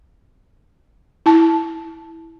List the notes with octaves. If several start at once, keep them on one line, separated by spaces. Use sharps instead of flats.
E4 A5